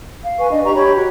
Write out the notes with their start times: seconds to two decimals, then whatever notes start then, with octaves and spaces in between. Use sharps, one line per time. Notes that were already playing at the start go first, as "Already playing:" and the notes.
0.24 F5
0.39 B4 G#5 C#6
0.51 D4 D#5
0.64 G4 A#5 C#6
0.75 G4 C#5 B5 C#6
0.95 F#4